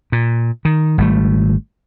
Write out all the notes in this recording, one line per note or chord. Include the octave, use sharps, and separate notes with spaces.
A#2
D#3
G#1 G3 A3